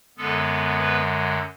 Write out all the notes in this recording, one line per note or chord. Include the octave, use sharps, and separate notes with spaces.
F#2 D3 G#3 B3 A4
B3 B4